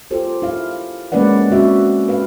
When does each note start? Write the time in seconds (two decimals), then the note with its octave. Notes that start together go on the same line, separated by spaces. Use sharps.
0.11 F4 G4 A4 C5
0.42 E4 F5
1.12 G#3 A#3 C#4 B4 D5 F#5
1.50 C3 C4 C#4 F#4 E5
2.08 G4 B4 F5